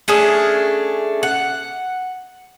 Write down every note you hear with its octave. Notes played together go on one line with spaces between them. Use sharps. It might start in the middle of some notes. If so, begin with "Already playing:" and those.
A3 C#4 D4 G#4
F#5